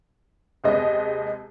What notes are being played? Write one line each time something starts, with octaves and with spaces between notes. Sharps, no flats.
D#2 C3 G#3 B3 D#5